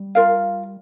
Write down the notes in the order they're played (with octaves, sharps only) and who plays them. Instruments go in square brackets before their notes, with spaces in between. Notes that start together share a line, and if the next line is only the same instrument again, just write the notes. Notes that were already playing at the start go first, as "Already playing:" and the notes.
Already playing: [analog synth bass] G3
[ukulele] F4 A#4 F5